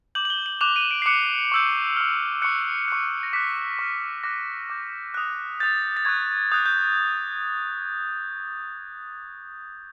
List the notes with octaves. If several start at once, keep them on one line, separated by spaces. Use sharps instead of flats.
D6 G6 F#7
F#7
G7
F#7
D6 F#6 F7
D#7
D7
C7
D6 F#6 C#7
C#6 E6 G6
C#6 F6
C#6 F#6 C#7
C#6 F#6
A#6
D6 F#6 B6
C#6 F6
D6 F#6 A#6
D6 G6
D#6 F#6
D#6 G6 A6
A6
C#6 F#6 G#6
D#6 F#6 G6
G6